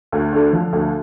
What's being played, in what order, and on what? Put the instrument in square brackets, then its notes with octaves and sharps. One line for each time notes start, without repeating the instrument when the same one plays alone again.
[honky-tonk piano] D2
D3
F3
D2